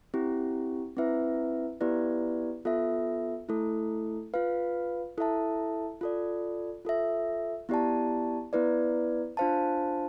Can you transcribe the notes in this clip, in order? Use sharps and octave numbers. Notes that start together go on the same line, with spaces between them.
C4 E4 G4
C4 E4 B4 E5
B3 E4 G4 B4 D5
B3 F4 A4 E5
A3 E4 A4
F4 B4 F5
E4 A4 E5 A5
F4 A4 D5
F4 A4 E5
B3 E4 G4 D5 A5
B3 E4 B4 D5
D4 F4 C5 F5 A5